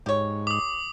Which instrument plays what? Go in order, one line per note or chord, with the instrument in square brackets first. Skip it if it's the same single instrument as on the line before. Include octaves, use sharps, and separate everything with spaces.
[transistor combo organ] G#2 [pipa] G4 C#5
[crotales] D6 D#6